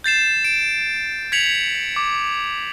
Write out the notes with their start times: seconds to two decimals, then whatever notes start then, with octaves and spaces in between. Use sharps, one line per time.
0.04 G6 A6 C7 E7
0.45 D7
1.32 G#6 B6 C#7 F7 F#7
1.96 D6